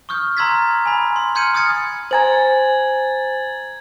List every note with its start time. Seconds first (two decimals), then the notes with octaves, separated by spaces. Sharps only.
0.09 C#6 D#6 F6 G6
0.37 A#5 C6 E6 G#6 A6 B6
0.86 G#5 B5
1.16 C6
1.35 C6 F6 G6 G#6 C#7 D#7
1.54 D#6 F6 G#6 A6 C#7
2.11 C5 G#5 A#5 G#6 A6 F#7